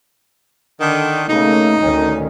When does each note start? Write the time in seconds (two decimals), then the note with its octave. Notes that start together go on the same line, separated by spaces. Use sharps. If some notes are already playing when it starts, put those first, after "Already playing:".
0.80 D3 D#3
1.29 C#3 A3 A#3 D#4
1.80 D2 D#3 C#4